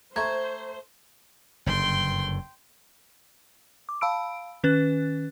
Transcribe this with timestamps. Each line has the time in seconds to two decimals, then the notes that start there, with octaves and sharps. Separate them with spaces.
0.16 A3 C5 A#5 C#6 G#6
1.66 F#1 G2 D3 G5 C6
3.89 D6
4.01 F5 A5 B5 E6 D7
4.64 D#3 C#4 B4 F#6 A6